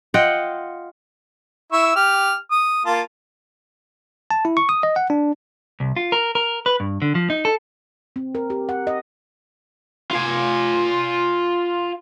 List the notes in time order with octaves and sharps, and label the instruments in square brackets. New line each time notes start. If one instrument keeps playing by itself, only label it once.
[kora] F4 D#5 F#5 G5
[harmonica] E4 C#6 E6
G4 F6
D#6
A#3 F4 A5
[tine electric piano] A5
E4
C#6
D#6
D#5
F#5
D4
[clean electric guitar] C2
F4
A#4
A#4
B4
G2
D3
F3
D#4
A4
[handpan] C4
A#4
G4
F#5
D#5
[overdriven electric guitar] F4 G#5